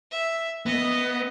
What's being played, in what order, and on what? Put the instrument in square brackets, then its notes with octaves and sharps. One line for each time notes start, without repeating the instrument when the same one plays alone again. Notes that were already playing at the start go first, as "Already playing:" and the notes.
[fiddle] E5
[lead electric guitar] B3 [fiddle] D#5